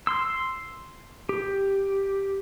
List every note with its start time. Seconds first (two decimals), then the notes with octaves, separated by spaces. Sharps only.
0.07 C6 E6
1.29 G4